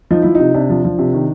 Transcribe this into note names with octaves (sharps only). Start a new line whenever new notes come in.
F3 D#4
F3 E4
C3 D#4
C3 D4
F3
F3
C3
D#3